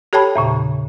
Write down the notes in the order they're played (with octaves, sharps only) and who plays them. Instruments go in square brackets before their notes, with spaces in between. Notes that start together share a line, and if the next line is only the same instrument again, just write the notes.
[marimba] G4 A4 C#5 G5 A5 B5
E2 A#2 C#3